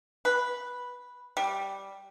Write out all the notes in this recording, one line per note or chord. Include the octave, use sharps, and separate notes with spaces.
B4
G3